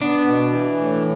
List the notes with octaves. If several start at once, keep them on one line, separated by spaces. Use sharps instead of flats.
B3 D4
B2
E3
A2